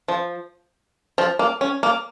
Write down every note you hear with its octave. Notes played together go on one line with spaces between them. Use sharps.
F3
F3
A#3
C#4
A#3